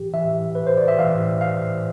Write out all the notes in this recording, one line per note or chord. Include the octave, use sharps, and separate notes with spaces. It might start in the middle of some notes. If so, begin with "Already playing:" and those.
Already playing: A2 E3 G4
A2 E3 E5
B4
C5
D5
E5
A2 E3 F5
F5